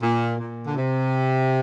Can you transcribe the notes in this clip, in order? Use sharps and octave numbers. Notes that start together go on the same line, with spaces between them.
A#2
A#2
D3
C3